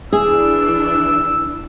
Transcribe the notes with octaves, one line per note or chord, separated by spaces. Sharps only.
E3 D4 G#4 E6